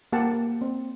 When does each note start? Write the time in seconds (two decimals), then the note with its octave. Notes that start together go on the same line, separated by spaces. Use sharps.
0.13 A#3 G4 F#5 A5
0.61 C4